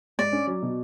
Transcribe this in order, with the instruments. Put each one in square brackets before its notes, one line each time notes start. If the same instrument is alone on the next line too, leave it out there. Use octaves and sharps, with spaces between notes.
[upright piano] G#2 [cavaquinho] D5
[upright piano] C#4
F#3
B2